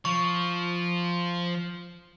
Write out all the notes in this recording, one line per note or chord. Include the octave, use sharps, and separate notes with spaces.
F3 C#6